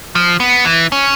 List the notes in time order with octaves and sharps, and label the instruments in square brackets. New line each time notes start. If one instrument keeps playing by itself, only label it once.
[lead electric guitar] F3
B3
E3
C#4